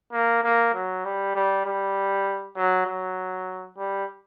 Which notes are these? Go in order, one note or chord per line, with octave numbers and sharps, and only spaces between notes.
A#3
A#3
F#3
G3
G3
G3
F#3
F#3
G3